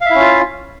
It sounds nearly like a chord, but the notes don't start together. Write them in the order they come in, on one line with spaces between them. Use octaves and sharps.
F5 E5 E4 C#4 F4